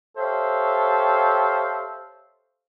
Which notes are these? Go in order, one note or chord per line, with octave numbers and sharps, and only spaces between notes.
G4 A4 C5 C#5 E5 F5